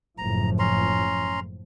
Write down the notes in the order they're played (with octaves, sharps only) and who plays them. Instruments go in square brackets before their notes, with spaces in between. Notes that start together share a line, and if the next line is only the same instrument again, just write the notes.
[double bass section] F#1 A2 F3 [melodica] A#5
[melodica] C#4 A#5 C6